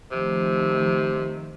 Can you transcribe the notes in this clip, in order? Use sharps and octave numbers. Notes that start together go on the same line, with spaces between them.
C3 D#3 F3 A3